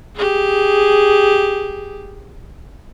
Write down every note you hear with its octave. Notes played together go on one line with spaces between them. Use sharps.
G4 G#4